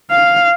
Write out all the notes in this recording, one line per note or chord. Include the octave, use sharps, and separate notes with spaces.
F5